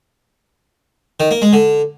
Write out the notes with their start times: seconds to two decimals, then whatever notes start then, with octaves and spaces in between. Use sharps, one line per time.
1.20 D#3
1.31 A#3
1.42 G#3
1.53 D3